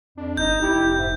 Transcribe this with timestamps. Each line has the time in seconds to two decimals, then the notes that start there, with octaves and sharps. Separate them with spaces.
0.17 F2 D4
0.37 G1 D#4 D#5 G6
0.61 F1 E4 G4
0.97 G#2 E5